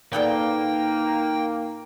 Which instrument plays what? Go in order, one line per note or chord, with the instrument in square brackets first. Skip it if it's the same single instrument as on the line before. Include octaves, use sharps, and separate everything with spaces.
[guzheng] A#2 B3 A4 [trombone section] A#3 [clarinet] D#4 [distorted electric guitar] G5